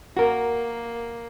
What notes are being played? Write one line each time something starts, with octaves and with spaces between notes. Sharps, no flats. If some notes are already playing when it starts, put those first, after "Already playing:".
A#3 F#4 A#4